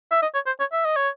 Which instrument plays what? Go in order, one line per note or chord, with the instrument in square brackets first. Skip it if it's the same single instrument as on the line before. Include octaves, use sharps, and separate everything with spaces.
[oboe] E5
D#5
C#5
C5
C#5
E5
D#5
C#5